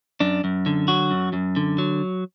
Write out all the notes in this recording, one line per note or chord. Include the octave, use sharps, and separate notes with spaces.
F#2 D4
F#2
D3
F#3 F#4
F#2
F#2
D3
F#3